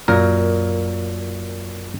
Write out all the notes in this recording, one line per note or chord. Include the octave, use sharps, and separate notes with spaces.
F#2 A#2 A#4